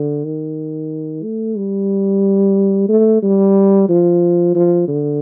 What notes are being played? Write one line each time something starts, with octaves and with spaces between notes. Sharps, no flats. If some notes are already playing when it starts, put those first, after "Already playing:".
Already playing: D3
D#3
A3
G3
A3
G3
F3
F3
D3